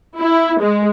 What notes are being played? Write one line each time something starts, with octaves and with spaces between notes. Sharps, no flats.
E4
G#3